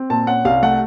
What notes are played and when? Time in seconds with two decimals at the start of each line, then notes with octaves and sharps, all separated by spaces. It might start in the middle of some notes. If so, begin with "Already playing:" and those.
Already playing: C4
0.10 A#2 A5
0.27 C#4 F#5
0.45 C2 F5
0.63 A3 F#5